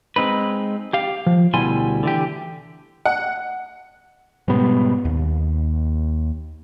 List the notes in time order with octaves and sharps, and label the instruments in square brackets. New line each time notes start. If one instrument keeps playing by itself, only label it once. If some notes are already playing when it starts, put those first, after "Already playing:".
[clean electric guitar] G#3 C4 D#4 B4
G4 F5
F3
D2 B2 G3 E4 G#5 C6
D3 E3 G4
[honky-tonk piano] F#5
[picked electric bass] G#2 B2 G3 B3
D#2